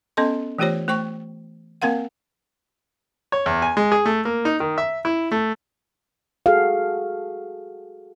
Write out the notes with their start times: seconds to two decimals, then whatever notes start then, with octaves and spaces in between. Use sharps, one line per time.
0.17 B3 C#4 A4 D#5 C6
0.58 E3 A3 F4 G4 C5 C#5
0.88 A3 C5 G5 C#6
1.82 A#3 C4 A#4 F5 F#5
3.32 C#5
3.46 E2
3.62 G#5
3.77 G#3
3.92 G#4
4.06 A3
4.25 A#3
4.45 D#4
4.60 D#3
4.78 E5
5.05 E4
5.32 A3
6.46 F#4 G#4 A4 F5